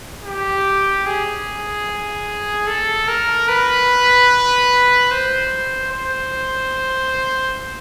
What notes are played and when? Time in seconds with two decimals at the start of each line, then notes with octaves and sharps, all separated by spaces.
0.24 G4
1.06 G#4
2.67 A4
3.08 A#4
3.48 B4
5.11 C5
5.92 C5